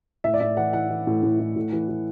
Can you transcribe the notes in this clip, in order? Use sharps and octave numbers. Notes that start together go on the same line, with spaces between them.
A2 E5
D5
A2 E5
E3 F#5
E3 F#5
E3
A2
A2
A2
A2
E3
E3